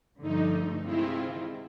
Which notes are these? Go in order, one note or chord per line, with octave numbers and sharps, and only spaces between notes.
G2 D3 F3 A3 D#4
C3 D#3 G#3 C4 E4 F4